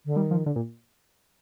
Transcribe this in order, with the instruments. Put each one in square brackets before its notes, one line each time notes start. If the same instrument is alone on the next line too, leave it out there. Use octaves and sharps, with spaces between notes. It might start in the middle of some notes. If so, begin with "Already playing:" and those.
[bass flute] D3
[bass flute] D#3 [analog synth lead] G3
[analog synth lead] F3
D3
A#2